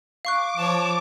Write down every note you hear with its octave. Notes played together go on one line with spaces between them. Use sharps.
F5 C#6 D6 F#6
F3 C#5 A5